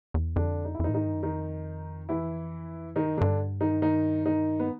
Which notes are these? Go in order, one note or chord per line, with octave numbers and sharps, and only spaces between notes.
E2
F2 D3 D4
D#4
E4
F2 D#3 D#4
A2
G#2 D#3 D#4
G2
F#2
F2 D#3 D#4
E3 E4
G2 D#3 D#4
F#2
G2 D3 D4
D#3 D#4
D#3 D#4
D#3 D#4
B3